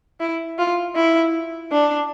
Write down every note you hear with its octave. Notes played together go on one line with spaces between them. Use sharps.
E4
F4
E4
D4